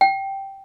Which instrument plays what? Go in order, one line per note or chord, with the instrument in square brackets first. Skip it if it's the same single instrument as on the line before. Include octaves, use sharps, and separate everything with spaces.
[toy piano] G5